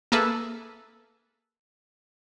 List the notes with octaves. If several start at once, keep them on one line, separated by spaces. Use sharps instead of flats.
A#3 G#4 A4 B4 E5